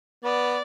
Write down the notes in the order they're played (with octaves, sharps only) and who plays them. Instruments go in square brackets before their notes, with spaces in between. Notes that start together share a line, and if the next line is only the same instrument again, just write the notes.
[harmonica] B3 [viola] D5